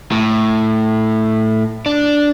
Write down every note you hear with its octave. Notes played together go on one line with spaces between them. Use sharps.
A2
D4